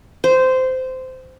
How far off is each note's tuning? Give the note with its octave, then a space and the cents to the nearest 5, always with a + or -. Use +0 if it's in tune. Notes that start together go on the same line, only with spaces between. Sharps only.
C5 -15